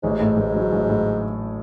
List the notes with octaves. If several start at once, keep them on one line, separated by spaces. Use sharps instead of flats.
A1 G#2
A2
A1
F#3
A1
A2